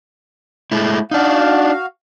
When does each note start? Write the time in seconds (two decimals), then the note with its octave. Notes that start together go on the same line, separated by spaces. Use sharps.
0.72 G#3 A3 E4
1.11 D4 D#4 F#4 F5